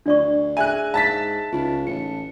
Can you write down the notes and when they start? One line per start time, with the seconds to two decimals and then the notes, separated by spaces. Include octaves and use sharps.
0.06 D2 D4 D5 C#6
0.57 G#4 E5 G#5 F#6
0.94 G#2 F5 A5 A6 B6
1.53 C#2 D#4 F4
1.87 A1 C#7